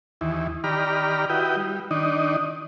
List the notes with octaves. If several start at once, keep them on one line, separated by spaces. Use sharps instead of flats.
D#2 E3
D#3 G4 D5 A#5 B5 F6
E4 F#4 G4 B4 D#5 G5
G3
D#3 D4 D#4